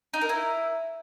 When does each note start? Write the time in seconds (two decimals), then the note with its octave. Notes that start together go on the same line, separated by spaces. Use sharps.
0.14 D#4
0.21 A#4
0.29 E4